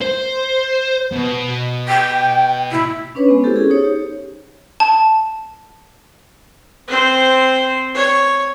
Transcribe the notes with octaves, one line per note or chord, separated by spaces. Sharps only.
C5
B2
G5
E4
C#4 D4 B4 C#5
G#3 B3 C4
E4 F#4 G4 A4 B4 C5
C#4 G#4 A4
D#4 C5 C#5
G4
A5
C4 C5
C#5